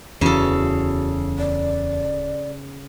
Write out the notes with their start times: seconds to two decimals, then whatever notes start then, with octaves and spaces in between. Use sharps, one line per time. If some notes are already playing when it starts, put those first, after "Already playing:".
0.21 D1 E2 C#3 E3 F#4 A4
1.38 D5